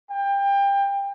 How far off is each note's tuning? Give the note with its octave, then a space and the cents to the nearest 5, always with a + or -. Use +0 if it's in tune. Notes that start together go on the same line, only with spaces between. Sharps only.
G5 +25